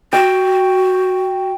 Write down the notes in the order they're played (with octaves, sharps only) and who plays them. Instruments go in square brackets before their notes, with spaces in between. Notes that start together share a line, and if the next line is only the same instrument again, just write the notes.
[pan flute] F#4 [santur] G5